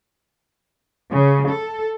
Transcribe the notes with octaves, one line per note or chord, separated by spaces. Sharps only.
C#3
A4